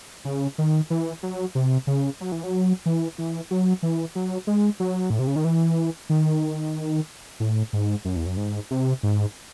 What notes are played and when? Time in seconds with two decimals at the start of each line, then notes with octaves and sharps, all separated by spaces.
0.25 C#3
0.58 D#3
0.90 E3
1.23 F#3
1.55 C3
1.87 C#3
2.21 F#3
2.32 E3
2.44 F#3
2.86 E3
3.18 E3
3.51 F#3
3.83 E3
4.15 F#3
4.47 G#3
4.80 F#3
5.10 A2
5.19 C3
5.27 C#3
5.36 D#3
5.45 E3
6.10 D#3
7.40 A2
7.73 G#2
8.05 F#2
8.16 E2
8.26 F#2
8.37 G#2
8.71 C3
9.03 G#2